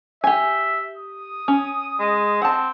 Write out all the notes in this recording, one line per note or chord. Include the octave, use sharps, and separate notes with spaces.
G4 E5 G#5
D#6
C#4
G#3
C4 F#5 A5